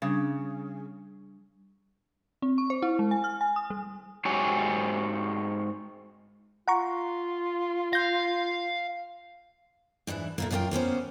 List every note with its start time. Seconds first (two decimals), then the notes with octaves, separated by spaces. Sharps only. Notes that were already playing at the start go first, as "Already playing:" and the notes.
0.02 C#3 G3 D4
2.42 C4
2.58 C#6
2.70 C5
2.82 E4
2.99 G#3
3.11 G#5
3.24 F6
3.41 G#5
3.56 D#6
3.70 G3
4.25 G#2 F#4 G4 C#5 G#5
6.68 F4 F#5 A#5 C#6
7.93 F5 G6 A#6
10.07 G#2 E3 D4 E4
10.38 A#2 A3 A#3
10.51 F#2 A3 F4 G4 A#4 G5
10.71 A#3 B3 C#4 C5